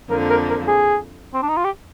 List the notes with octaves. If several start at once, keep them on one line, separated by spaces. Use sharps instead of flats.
F2 D3 F3 A#3 A#4
A#4
A#4
G#4
C4
D4
D#4
F4
G4